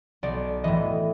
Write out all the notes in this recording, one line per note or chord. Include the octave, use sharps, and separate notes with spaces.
B1 D5
A2 E3 D#5